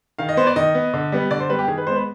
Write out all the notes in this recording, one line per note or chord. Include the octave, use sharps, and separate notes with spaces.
D#3 F5
D#5
B3 C5
D5
D#3 D#5
B3
D3
G3 B3
D3 D5
C5
G3 B3 B4
G4
D#3 G#4
B4
G#3 B3 C5
B4